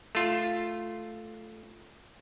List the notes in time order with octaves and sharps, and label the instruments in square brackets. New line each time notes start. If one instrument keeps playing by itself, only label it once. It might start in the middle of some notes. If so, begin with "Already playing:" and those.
[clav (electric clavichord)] A3 F4